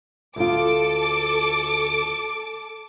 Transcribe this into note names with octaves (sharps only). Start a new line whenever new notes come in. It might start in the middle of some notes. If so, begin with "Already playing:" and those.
D2 F4 A4 D6